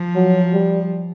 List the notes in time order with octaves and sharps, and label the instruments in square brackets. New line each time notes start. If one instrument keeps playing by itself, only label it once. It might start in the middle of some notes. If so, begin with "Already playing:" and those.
Already playing: [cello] F3
[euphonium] F#3
G3